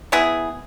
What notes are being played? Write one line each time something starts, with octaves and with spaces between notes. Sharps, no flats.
B3 E4 G#4